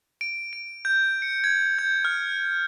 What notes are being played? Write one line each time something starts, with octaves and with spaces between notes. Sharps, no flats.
D7
D7
G6
C#7
G#6
G6
F6